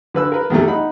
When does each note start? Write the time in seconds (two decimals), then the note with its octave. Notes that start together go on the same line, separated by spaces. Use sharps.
0.14 D3 B4 E6
0.32 A#4 B4
0.50 E2 B2 D#3 G3 A3
0.67 D#4 F#5 B5